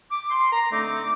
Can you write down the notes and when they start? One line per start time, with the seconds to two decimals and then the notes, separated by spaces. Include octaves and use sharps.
0.10 D6
0.31 C6
0.52 A#5
0.71 D3 A3 C4 D#4 D6